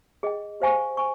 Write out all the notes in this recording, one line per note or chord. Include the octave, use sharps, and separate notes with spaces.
G#4 D#5 G5
G4 C5 F5 G#5 C#6
G#5 C#6